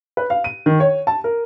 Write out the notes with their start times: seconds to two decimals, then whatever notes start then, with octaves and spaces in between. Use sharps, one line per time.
0.17 B4
0.30 F5
0.44 D#7
0.66 D#3
0.80 C#5
1.07 A5
1.24 A#4